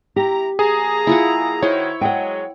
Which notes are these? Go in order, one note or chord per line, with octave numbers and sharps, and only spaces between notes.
E4 G4 A#5
F3 A#3 G#4 A#5
E4 F4 F#5
D#3 E4 F#4 C5 C#5
F#3 G#3 F#5 G5